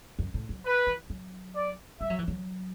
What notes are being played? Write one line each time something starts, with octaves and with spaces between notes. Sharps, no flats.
F#2
A2
F#3
B4
E3
F#3
D5
G3 E5
F#3
E3
F#3